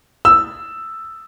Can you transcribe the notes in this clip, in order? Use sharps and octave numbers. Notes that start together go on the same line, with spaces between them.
E6